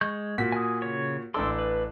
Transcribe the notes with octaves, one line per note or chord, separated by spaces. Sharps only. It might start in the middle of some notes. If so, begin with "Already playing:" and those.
G#3 C#6 G6
A#2 F#4 B6
G#5 D#6
C#3 C#5
A1 D4 A4 C6 D6 E6
B4